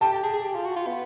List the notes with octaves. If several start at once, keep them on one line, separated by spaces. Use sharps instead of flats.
G4 G5 A5
G4
G#4
G#4
G4
F4
F#4
F4
B3